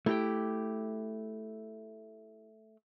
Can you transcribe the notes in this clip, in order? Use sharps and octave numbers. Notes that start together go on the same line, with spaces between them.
A3 E4 G4 G5